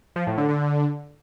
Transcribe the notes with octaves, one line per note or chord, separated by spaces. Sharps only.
F3
A2
D3
D3